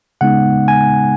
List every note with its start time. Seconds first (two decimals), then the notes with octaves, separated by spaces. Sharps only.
0.21 C#3 G#3 B3 D#4 F#5
0.68 G#5